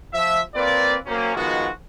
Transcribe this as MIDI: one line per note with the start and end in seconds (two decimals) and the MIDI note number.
0.13 0.39 53
0.13 0.39 76
0.55 0.94 58
0.55 0.94 60
0.55 0.94 65
0.55 0.94 71
0.55 0.94 74
1.06 1.32 54
1.06 1.32 58
1.06 1.32 60
1.06 1.32 61
1.35 1.67 51
1.35 1.67 53
1.35 1.67 56
1.35 1.67 59
1.35 1.67 65
1.35 1.67 66